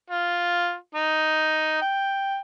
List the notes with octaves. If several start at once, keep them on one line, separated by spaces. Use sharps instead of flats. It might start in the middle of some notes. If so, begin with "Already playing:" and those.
F4
D#4
G5